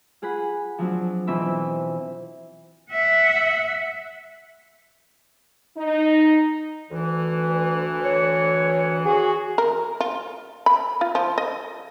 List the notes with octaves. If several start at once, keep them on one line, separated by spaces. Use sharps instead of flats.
F4 G#4 F#5 B5
F3 F#3 C4 D4
B2 E3 C4 F4 E5 B5
E5 F#5
D#4
D2 E3
C#5
F#4 G#4
A#4
F4
B5
F4
F3
D#5